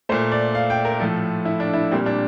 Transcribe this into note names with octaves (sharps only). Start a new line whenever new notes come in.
A#2 A3 C5
D5
F5
G5
A#4
A2 F3 A3 A4
E4
D4
E4
A#2 G3 A#3 C4
D4